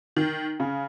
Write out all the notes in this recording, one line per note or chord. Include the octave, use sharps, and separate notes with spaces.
D#3
C#3